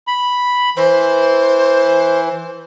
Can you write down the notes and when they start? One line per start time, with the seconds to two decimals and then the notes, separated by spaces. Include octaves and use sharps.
0.07 B5
0.77 E3 C5